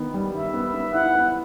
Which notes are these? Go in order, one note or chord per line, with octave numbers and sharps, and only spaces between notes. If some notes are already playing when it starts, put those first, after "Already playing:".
Already playing: D#3 B3
G3
D#3 E5
B3
B3
E4 F#5
B3